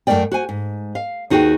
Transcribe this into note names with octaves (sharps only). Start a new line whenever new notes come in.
F#2 A3 F4 A#4 D5 G5
F#4 C5 G#5
G#2
F5
D#2 D#4 F#4 G#4 B4 G5